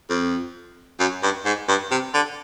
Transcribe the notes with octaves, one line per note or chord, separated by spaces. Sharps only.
F2
F#2
G2
G#2
G2
C3
D3